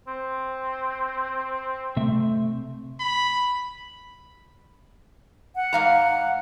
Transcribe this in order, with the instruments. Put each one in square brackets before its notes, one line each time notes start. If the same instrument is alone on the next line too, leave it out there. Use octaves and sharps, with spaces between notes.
[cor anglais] C4
[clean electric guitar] C3 A3 E5
[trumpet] B5
[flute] F#5
[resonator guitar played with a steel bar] G#2 F5 A#5